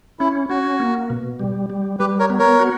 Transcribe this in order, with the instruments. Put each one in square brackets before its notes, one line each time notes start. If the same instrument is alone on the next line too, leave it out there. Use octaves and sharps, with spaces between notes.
[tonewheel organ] C#4 [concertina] E4
[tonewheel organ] C#4 [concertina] F#4
[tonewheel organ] A#3
B2
G3
G3
[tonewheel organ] G3 [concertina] G4 B4
[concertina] A#4 C#5
[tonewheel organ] B3
[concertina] A#4 C#5
[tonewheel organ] F#4